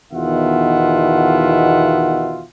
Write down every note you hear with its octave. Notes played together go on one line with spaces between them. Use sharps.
E2 B2 D#3 F4 E5 F#5